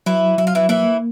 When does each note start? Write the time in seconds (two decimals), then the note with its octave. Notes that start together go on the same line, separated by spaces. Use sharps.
0.06 E3 F#3 E4
0.38 F#3 E4
0.47 F4
0.55 E3 E4
0.69 E3 A#3 E4